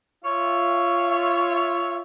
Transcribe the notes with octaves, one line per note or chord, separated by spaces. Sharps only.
F4 C#5 E5